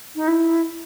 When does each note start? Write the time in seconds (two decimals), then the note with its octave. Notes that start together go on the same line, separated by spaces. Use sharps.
0.15 D#4
0.27 E4